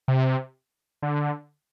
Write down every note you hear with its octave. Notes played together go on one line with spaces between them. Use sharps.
C3
D3